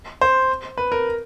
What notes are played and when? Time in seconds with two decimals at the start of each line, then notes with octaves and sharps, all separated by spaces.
0.21 C5
0.78 B4
0.92 A#4